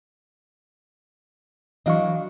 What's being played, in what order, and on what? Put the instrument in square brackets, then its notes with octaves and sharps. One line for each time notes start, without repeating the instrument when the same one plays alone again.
[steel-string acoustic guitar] E3 F#3 D4 [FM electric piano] D#5 F5 C#6